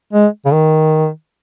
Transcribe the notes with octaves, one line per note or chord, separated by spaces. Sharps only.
G#3
C#3
D#3